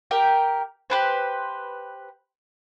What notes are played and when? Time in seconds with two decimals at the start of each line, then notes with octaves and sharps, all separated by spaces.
0.11 G4 A#4 G5
0.90 G4 B4 C5